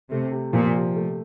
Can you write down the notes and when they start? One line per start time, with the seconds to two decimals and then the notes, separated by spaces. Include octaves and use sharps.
0.11 C3 A3
0.32 C3
0.53 A#2 F3
0.74 C3
0.96 A3